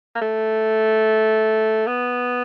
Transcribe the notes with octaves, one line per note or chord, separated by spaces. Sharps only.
A#3
A3
B3